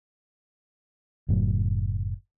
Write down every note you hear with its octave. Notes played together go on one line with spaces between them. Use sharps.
F#1 A2 F#3